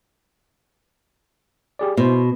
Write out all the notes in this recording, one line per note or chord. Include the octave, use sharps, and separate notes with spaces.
G4 G#4 D5
B2 E4 C5